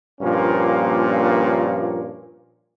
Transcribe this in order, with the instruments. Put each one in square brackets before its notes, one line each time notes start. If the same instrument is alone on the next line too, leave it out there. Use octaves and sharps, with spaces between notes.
[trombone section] G2 A#2 F3 A#3 C#4 D4